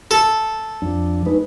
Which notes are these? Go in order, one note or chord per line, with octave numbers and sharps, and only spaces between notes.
A4
F2 F3 D4
G#3 D#4 B4